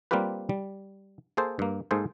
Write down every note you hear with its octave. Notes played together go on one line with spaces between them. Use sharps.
G3 A#3 C4 F4 G4 B4
G3
A#3 G#4 A4 C5
G2 A#3
G#2 A#3 G#4 A4 C5